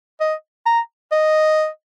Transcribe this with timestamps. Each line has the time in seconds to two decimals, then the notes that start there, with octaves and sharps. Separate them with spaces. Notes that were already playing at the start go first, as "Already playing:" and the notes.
0.21 D#5
0.66 A#5
1.12 D#5